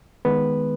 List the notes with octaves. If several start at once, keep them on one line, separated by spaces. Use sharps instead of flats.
D#3 G#3 B3 B4